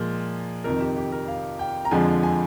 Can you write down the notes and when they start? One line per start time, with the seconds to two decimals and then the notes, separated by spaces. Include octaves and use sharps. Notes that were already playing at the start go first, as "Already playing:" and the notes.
Already playing: A#2 F3 G#3
0.64 F2 C3 D#3 A#4
0.81 G4
0.97 G4
1.12 A#4
1.28 F5
1.59 G5
1.85 A#5
1.91 F2 D3 F3 G#3 G#5
2.23 G#5